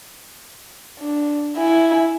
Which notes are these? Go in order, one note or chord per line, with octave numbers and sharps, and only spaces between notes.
D4
E4 G#5